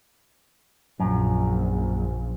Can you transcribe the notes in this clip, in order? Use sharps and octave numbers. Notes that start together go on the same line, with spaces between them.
A#1 F#2